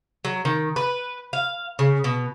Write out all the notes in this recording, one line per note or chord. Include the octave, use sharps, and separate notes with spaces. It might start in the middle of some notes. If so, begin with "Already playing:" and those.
F#3
D#3
B4
F5
C#3
B2